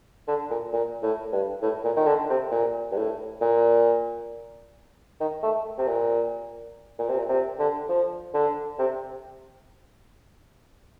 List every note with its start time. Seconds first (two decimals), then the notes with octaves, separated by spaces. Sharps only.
0.28 D3
0.50 A#2
0.73 A#2
1.02 A2
1.32 G2
1.62 A2
1.84 A#2
1.96 D#3
2.07 D3
2.29 C3
2.51 A#2
2.92 G2
2.97 A2
3.41 A#2
5.20 D#3
5.43 A3
5.78 C3
5.87 A#2
6.99 A#2
7.09 C3
7.18 A#2
7.29 C3
7.59 D3
7.89 F3
8.34 D3
8.79 C3